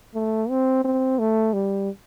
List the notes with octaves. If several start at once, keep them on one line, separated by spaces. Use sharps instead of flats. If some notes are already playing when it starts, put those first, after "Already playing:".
A3
C4
C4
A3
G3